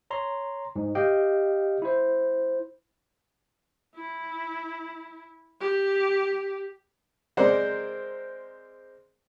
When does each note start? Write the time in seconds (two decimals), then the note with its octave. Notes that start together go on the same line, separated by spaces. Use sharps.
0.10 C#5 A#5 C6
0.76 G#2
0.95 G4 D#5 F5 G5
1.82 E4 C5
3.95 E4
5.61 G4
7.37 G#3 C4 A#4 C5 D5 F#5